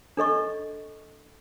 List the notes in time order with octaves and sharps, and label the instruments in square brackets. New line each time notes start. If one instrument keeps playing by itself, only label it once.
[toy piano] D4 A4 D#5 C#6